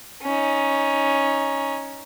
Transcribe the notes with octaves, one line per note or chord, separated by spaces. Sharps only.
C#4 D#4